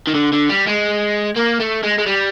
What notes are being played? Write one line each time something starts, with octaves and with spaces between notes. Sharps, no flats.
D#3
D3
D3
G3
G#3
A#3
A3
G#3
G#3
G3